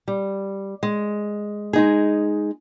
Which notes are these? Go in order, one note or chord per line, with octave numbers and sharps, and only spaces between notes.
G3
G#3
G#3 D#4 G#4